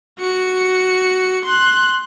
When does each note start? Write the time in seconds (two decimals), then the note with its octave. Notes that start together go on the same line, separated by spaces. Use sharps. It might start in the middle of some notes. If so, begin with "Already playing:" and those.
0.19 F#4 C#7
1.44 C6 F#6